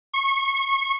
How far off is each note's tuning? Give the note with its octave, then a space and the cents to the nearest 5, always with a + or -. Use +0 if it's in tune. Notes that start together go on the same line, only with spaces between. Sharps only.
C#6 -25